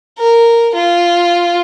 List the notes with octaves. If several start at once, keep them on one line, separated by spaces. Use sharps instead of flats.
A#4
F4